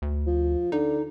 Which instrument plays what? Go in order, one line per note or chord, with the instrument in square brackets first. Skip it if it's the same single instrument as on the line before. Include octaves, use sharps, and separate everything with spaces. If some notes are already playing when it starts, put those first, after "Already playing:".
[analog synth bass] D2
[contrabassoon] F3
[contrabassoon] D3 [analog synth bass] D#4